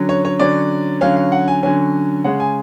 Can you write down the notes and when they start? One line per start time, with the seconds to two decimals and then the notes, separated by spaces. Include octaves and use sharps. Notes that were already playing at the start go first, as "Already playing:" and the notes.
Already playing: D3 F#3 C#4
0.09 C#5
0.25 C#5
0.39 D3 F#3 C#4 D5
1.01 D3 F#3 C#4 F5
1.16 F5
1.32 F#5
1.48 G#5
1.63 D3 F#3 C#4 G#5
2.24 C#3 G#3 C#4 F#5
2.40 G#5